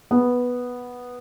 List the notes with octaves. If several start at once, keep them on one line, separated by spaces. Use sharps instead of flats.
B3